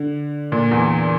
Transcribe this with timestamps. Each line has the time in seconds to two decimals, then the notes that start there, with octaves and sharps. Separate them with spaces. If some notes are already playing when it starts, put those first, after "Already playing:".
Already playing: D3
0.52 A#2
0.71 E2